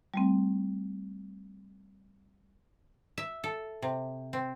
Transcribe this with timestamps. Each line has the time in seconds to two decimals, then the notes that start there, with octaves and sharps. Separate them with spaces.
0.14 G3 A3 C4
3.18 E5
3.44 A4
3.82 C3
4.33 C4